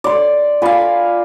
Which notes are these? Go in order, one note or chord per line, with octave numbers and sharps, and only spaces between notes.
D5 C6
F4 D5 F5 G#5 B5